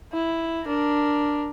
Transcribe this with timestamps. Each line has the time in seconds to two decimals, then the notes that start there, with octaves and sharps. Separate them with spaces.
0.13 E4
0.65 D4 A#4